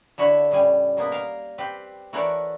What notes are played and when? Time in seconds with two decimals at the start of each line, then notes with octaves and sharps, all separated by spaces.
0.18 D3 E4 F#4 C#5
0.51 A2 C#3 G3 G#5
0.97 B2 A#3 B3
1.11 A#4 F5
1.58 C4 G4 B4
2.13 E3 A3 F#4 A#4 C#5 D5